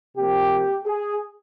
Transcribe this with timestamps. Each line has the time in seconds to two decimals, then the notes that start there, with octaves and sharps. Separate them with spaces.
0.16 C3 F3 A#3 G4
0.85 G#4